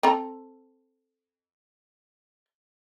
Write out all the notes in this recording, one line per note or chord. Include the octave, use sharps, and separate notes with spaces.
C4 A4 A#5